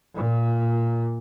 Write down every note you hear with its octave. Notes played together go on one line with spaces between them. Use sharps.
A#2